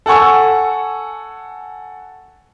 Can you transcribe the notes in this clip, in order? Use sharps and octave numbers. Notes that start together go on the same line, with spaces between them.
A4 F#5 G#5 C#6 E6